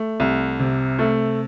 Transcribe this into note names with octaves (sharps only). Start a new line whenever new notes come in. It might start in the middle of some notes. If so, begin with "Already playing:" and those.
Already playing: A3
C2
C3
A3